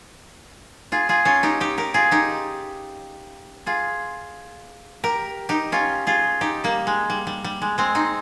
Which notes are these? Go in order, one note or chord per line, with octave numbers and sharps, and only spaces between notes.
F4 G#4
F4 G#4
C#4 F4
D#4 G4
D#4 G4
G4 A#4
F4 G#4
D#4 G4
F4 G#4
G4 A#4
D#4 G4
C#4 F4
F4 G#4
D#4 G4
G3 A#3
G#3
G3
G3
G3
G#3
G#3 C4
C4 D#4